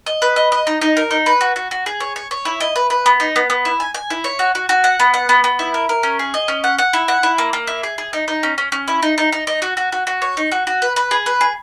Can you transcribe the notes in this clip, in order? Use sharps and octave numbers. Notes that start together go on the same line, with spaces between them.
D#5
B4
D#5
D#5
D#4
D#4
A#4
D#4
B4
F#4
F#4
F#4
G#4
C#5
C#5
C#5
E4
D#5
B4
B4
B3
D#4
B3
B3
E4
G#5
G#5
E4
C#5
F#4
F#4
F#4
F#5
B3
F#5
B3
B3
E4
A#4
A#4
C#4
G#4
D#5
C#4
F#5
F#5
E4
F#5
E4
A#3
A#3
E4
G#4
G#4
D#4
D#4
C#4
C#4
C#4
E4
D#4
D#4
D#4
D#4
F#4
F#4
F#4
F#4
C#5
D#4
F#4
F#4
B4
B4
G#4
B4
G#4